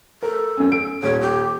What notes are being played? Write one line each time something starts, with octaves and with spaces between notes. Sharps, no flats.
A4 A#4
F#2 C#4
D7
D#1 C#5
G4